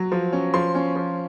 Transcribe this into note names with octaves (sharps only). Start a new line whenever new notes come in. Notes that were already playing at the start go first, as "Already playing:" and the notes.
Already playing: F#3
F3
C#4
F3 C6
C#4
F3